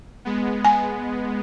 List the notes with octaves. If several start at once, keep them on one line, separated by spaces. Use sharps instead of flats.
G#3 B3
G#5